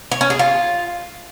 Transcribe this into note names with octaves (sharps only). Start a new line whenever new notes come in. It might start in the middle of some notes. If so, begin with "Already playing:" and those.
C#5
C#4
G#4
F4